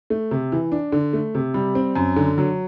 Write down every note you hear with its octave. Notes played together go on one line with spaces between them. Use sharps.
A3
C3
E3
D4
D3
A3
C3
G3
C4
F#2
D3
F#3